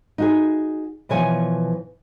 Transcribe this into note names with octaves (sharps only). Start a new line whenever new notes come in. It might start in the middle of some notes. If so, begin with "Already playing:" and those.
D#4 F#4 G#4
B2 E3 F3 C#5 G#5